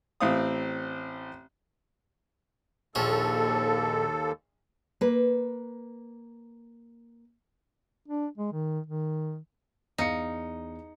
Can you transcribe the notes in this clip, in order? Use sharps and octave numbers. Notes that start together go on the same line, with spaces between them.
A1 A2 C4 F5 D#6
A#1 D#2 F3 A4 C#5
A#3 B4
D4
G#3
D#3
D#3
E2 D#4 F5 C#7